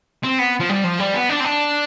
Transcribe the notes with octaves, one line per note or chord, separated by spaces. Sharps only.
C4
B3
F3
G3
F3
G3
B3
D4
C4
D4